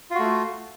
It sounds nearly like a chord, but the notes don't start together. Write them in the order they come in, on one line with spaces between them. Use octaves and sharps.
F4 F#4 A3